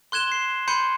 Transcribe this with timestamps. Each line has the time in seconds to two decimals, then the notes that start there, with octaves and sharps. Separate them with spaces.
0.12 C6 F#6 G#6 E7 G7
0.32 C7
0.68 B5 C6 G6 C#7 D#7